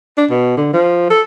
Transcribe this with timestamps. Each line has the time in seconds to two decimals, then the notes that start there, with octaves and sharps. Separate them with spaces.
0.18 D4
0.30 B2
0.57 D3
0.73 F3
1.10 A4